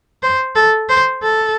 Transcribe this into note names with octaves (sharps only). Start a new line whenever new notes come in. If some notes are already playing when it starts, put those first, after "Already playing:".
C5
A4
C5
A4